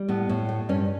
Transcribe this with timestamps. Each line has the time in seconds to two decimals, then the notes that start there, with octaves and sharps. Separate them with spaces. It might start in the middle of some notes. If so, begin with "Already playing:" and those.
Already playing: G3
0.08 A2 B3
0.29 A2
0.49 A3
0.69 G2 C#4